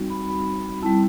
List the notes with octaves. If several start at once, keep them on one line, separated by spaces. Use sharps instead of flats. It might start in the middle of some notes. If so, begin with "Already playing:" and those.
Already playing: G3 C4 D#4 F#4
B5
B5
G3 C4 E4 A5